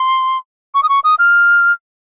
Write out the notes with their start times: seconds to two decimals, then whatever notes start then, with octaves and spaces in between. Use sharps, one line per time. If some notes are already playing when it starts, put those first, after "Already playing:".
Already playing: C6
0.75 C#6
0.83 D#6
0.89 C#6
1.04 D#6
1.19 F6